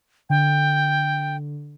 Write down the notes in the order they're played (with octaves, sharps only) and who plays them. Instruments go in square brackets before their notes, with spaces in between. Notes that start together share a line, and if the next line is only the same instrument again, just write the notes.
[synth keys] D3 [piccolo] G5